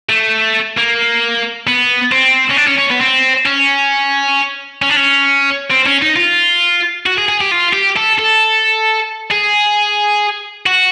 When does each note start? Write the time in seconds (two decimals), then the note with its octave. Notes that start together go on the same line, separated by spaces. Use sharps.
0.09 A3
0.77 A#3
1.67 B3
2.12 C4
2.51 C#4
2.57 D4
2.68 C#4
2.78 C#4
2.90 B3
3.01 C4
3.46 C#4
4.82 C#4
4.90 D4
4.97 C#4
5.71 C4
5.87 C#4
6.02 D#4
6.16 F4
7.06 F#4
7.18 G#4
7.29 G#4
7.41 G4
7.51 F4
7.73 G4
7.96 A4
8.18 A4
9.31 G#4
10.66 F#4